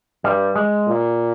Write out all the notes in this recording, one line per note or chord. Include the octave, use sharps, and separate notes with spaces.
G2 G3
G#3
A#2